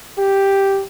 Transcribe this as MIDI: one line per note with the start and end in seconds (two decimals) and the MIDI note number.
0.18 0.82 67